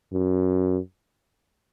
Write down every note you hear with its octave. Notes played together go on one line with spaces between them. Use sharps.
F#2